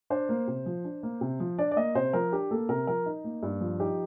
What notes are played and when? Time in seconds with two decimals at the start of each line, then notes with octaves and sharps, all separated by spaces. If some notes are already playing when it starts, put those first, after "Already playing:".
0.10 D4 C5
0.29 A#3
0.48 C3
0.66 F3
0.85 D4
1.03 A#3
1.21 C3
1.40 F3
1.58 D4 D5
1.71 D5
1.76 A#3 D#5
1.95 C3 C5
2.13 F3 A#4
2.32 D4 G4
2.51 A#3 A4
2.69 C3 A#4
2.87 F3 A#4
3.06 D#4
3.24 A#3
3.43 G2
3.61 F3
3.80 D#4 G4